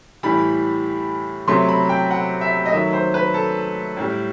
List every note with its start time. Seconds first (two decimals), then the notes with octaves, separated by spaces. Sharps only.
0.23 A2 E3 G3 B5
1.48 C3 F#3 A3 C6
1.68 B5
1.89 G5
2.11 F#5
2.41 E5
2.66 D#5
2.72 D#3 F#3 A3 E5
2.93 C5
3.14 B4
3.34 A4
3.97 A2 G3